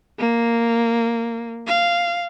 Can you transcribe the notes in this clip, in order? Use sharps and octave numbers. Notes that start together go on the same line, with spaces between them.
A#3
F5